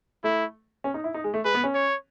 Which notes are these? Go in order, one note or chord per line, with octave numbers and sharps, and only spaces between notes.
A3 E4
C#4
D#4
E4
D#4
G#3
A3
G#3 B4
B3
C#4
C#5